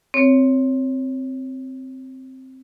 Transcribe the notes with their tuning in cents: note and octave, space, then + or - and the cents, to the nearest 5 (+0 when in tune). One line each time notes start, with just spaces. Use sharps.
C4 +0 C#5 +5